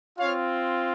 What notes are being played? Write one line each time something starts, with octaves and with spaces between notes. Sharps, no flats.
C4 F4 C#5 F5